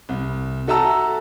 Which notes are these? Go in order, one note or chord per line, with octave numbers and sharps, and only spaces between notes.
C2
F#4 A4 E5 A5 A#5 E6